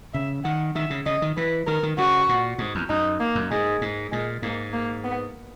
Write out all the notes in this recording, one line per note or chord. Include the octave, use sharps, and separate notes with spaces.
C#3 E5
D#3 F#5
D#3 E5
C#3
C#3 D#5
D#3
E3 B4
D#3 A#4
D#3
C#3 F#4
A#2
G#2
E2
F#2 D#4
A#3
F#2
G#2 G#3
G#2
A#2 G#3
G#2 A#3
A#3
B3